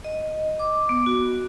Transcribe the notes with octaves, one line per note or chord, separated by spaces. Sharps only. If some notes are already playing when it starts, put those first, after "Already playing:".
D#5
D6
B3
F#4